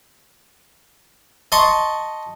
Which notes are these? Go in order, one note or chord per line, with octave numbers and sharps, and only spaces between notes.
D#5 A5 A#5 C6 C#6